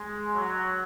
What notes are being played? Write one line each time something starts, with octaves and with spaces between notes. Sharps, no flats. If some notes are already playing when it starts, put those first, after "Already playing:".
Already playing: G#3
F#3